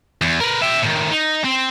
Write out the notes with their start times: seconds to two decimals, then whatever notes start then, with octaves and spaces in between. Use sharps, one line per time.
0.22 E2
0.41 A#4 B4
0.62 E5 G5
0.83 A2 D#3
1.11 D#4
1.44 C4